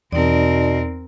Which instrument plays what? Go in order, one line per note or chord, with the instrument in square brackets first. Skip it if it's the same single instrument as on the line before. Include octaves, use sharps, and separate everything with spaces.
[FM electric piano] E2 [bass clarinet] B2 [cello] C4 A#4 [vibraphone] D#4 D5